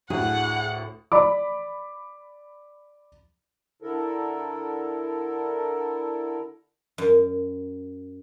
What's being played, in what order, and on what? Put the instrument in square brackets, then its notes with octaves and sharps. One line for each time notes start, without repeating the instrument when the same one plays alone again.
[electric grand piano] D2 A2 [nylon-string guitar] G#4 [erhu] F#5
[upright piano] D5 B5 D6
[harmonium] D3 E4 A4 A#4
[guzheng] F#2